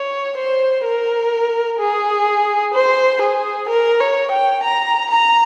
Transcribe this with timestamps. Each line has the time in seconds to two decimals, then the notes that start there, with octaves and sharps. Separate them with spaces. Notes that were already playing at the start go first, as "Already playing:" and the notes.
Already playing: C#5
0.37 C5
0.85 A#4
1.79 G#4
2.74 C5
3.22 G#4
3.69 A#4
4.00 C#5
4.31 G5
4.64 A#5
5.11 A#5